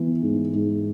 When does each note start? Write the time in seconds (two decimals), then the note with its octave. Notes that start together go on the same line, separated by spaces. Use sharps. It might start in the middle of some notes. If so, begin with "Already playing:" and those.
Already playing: E3 B3
0.22 G#2
0.54 G#2